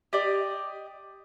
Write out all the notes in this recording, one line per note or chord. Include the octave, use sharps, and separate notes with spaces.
G4 D5 D#5